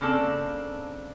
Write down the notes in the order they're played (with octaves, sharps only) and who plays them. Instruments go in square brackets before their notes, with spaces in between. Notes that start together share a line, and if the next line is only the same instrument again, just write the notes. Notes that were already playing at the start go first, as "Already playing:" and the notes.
[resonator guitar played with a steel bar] C#3 A#3 C4 D4 A4